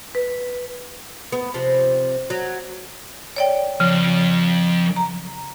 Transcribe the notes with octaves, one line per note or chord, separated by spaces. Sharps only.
B4
B3
C3 F3
F#3
C#5 D5 G5
F2 C#3
A#5